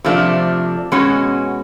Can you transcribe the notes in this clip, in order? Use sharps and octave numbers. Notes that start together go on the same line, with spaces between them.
C3 F3 A3 D4
B2 G#3 C#4 F#4